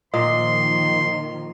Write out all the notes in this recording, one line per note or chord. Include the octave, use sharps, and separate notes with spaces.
A#2 D#3 F3 D#5 C6